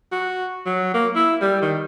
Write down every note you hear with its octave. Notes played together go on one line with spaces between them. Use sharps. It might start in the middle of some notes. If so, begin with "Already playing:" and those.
F#4
F#3
A#3
E4
G3
D#3